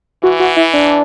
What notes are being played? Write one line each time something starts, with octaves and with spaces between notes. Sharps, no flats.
E3 F#4
F#4
E4
D4